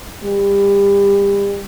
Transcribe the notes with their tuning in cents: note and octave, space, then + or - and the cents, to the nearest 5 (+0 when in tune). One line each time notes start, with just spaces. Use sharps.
G3 +30